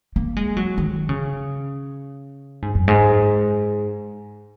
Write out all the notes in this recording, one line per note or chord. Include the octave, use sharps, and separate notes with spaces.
A#3
G#3
F#3
D#3
C#3
G#2
F#2
G#2